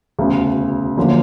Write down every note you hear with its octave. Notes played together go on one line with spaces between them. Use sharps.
E1 D2 C#3
F#1 F#2 D3 F3 A#3